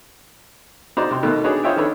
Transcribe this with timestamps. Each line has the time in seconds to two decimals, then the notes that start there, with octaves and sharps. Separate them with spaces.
0.97 D#4 F#4 C5 D5 A#5
1.11 C3 C6
1.23 B2 D#3 A3 A#3
1.44 D4 D#4 F#4 G#4 B4 C#5
1.63 F4 C5 C#5 D#5 E5 G5
1.76 D#3 D4 A4 B4 C#5